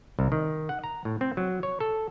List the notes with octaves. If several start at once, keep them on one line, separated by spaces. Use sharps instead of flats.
C2
D#3
F#5
A#5
A2
C4
F#3
C#5
A4